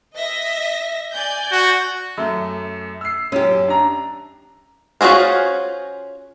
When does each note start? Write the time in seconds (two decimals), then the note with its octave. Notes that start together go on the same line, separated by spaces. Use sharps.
0.17 D#5 E5 A#6
1.12 D5 G#5 G6
1.52 F#4
2.17 F#2 A3
3.01 E6 C7
3.32 F#2 C#4 G4
3.68 D4 A#5
5.01 C#4 F4 F#4 G#4 C5